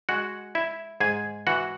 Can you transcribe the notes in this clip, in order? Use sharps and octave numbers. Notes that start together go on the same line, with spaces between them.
G#3 F#4 F#5
E4 E5
G#2 G#4 G#5
E3 F#4 F#5